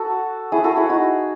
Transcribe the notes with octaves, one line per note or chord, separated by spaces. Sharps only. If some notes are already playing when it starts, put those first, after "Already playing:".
Already playing: F#4 A4
E4 G#4
F#4 A4
E4 G#4
D#4 F#4